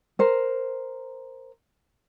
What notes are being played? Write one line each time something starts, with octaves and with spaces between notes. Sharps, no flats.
A#4 C5